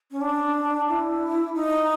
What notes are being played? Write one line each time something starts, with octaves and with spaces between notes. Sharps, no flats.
C#4
D4
E4
D#4